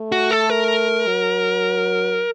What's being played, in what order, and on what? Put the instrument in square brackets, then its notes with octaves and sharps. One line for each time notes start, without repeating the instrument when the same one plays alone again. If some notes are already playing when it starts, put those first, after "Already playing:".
Already playing: [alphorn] A3
[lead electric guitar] F#4
A4
A#4
[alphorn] F#3